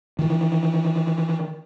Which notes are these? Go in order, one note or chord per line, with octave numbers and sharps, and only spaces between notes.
D#3 E3